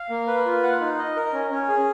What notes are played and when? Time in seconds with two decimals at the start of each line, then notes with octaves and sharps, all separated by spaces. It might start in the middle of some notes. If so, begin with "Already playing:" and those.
Already playing: F5
0.10 A#3
0.27 B4
0.45 F4
0.63 F#5
0.81 D#4
0.98 D#5
1.16 A#4
1.33 C#4
1.51 C#4
1.68 G#4